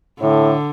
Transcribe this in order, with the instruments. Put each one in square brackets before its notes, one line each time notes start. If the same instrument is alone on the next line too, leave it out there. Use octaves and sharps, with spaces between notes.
[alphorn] A2 [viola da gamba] D3